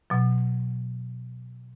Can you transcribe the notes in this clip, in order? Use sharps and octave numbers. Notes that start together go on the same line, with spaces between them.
B2 F#3